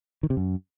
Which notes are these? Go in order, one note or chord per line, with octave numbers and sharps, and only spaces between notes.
D#3
C3
F#2